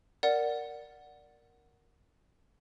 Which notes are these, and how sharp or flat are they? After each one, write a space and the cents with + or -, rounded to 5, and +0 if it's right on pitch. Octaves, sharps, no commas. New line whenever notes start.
A#4 +0 D5 +0 F#5 +0